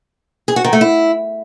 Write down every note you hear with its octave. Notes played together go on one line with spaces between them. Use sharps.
G#4
F#4
D#3
A3
E4